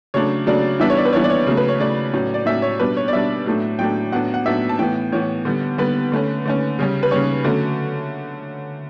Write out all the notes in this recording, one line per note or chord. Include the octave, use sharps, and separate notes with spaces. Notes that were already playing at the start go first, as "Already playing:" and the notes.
C#3 F#3 A3 D4 C#5
C#3 F#3 A3 D4 D5
E3 G3 B3 D4 E5
C#5
D5
B4
E3 G3 B3 D4 C#5
D5
C#5
C#3 F#3 A3
B4
C#5
C#3 F#3 A3 D5
A2 F#3 C#4
D5
A2 F#3 C#4 E5
C#5
B2 G3 D4 B4
C#5
D5
B2 G3 D4 E5
A2 F#3 A3 D4
A2 F#3 A3 D4 G5
A2 F#3 B3 D4 F#5
F#5
A2 F#3 B3 D4 E5
A5
A2 E3 B3 G5
A2 E3 B3 C#5
D3 G3 B3
D3 G3 B3 B4
D3 A3 C#4
D3 A3 C#4
C#3 G3 C#4
B4
C#3 G3 C#4 C#5
D3 F#3 A3 C#4